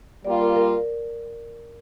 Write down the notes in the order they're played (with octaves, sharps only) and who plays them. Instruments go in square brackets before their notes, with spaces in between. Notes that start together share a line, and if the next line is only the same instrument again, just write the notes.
[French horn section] G3 A#3 F4 [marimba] D5
[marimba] A#4
A#4